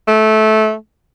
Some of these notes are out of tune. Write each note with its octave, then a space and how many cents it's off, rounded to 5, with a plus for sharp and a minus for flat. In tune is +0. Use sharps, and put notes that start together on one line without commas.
A3 -20